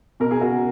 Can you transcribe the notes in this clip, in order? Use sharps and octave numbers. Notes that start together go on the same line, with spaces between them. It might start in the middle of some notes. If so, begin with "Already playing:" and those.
B2 A#4
G#4
F#4 A#4